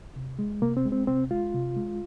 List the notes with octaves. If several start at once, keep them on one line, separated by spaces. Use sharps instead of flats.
C3
G#3
C3 A#3
C4
G#3
C4
C3 C4
G#3 F4
C3
G#3